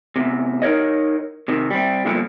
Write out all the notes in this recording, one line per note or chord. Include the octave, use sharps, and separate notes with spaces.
E2 C3
D#4 A#4 C5 C#5 D#5
C3 D#3
G3 C4
E2 G2 A#2 D3 F3